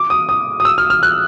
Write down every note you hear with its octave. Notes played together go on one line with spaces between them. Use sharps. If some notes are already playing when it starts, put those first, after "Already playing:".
Already playing: D6
D#6
D#6
D#6
E6
F6
F6
F#6